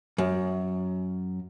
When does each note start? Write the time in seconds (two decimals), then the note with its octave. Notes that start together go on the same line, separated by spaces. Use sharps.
0.18 F#2